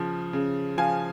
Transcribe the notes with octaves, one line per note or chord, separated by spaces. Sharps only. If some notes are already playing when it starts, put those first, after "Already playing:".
Already playing: C#3 F3
C#3
F3 F5 G#5